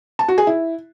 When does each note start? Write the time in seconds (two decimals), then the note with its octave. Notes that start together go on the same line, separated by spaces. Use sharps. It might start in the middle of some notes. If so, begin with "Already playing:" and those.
0.19 A5
0.28 F#4
0.38 G#4
0.47 E4